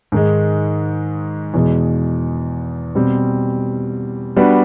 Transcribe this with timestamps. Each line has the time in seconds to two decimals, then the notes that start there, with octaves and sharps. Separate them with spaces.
0.12 G#2 D#3 G#3
1.54 E2 B2 G#3
2.95 B2 G3 C4
4.36 G3 B3 D4 F#4 B4